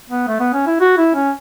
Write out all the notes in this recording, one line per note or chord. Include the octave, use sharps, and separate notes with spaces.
B3
A3
B3
C#4
E4
F#4
E4
C#4